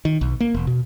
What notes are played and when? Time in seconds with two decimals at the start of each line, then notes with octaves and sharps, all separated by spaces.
0.05 D#3
0.21 B1
0.40 A#3
0.54 E1
0.67 B2